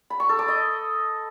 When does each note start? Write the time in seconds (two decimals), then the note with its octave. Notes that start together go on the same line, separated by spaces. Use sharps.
0.10 B5
0.20 C#6
0.29 A4
0.39 D6
0.48 D#5